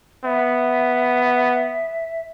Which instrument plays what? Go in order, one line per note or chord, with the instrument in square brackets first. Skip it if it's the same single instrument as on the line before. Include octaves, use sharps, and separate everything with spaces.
[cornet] B3 [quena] E5